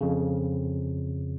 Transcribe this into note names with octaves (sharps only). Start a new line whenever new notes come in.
F2 C#3